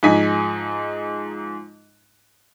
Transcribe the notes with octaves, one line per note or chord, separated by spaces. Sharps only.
G#2 F3 D#4 G#5 B6